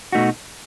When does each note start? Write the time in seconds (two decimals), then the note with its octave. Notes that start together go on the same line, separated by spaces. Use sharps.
0.12 B2 A3 D#4 F#4